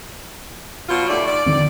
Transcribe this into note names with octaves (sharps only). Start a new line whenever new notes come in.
B2 F#3 F4
D#2 A3 D5
D5
D3 D#3 C4